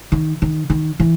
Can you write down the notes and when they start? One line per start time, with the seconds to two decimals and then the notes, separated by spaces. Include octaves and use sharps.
0.12 D#3
0.42 D#3
0.70 D#3
1.00 E3